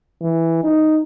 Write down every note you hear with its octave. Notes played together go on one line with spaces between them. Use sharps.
E3
D#4